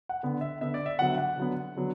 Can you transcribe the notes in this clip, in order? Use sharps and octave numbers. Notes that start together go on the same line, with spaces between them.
F#5
D3 B3
E5
D3 B3 E5
D5
E5
D3 F#3 B3 F#5
F#5
D3 F#3 B3
D3 F#3 B3